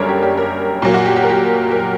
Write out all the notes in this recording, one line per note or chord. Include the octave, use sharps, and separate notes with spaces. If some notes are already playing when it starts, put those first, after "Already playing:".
Already playing: F#2 D3 G3 A#3 A#4 C#5 D5 A#5
G4
G4
A#4
A#2 F#3 A#3
F#4
G4
G4
A#4
G4
A#4